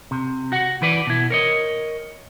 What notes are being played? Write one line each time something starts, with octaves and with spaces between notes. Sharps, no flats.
C3
F#4 F#5
E3 B4 D5
B2 E4
A#4 C#5 D#5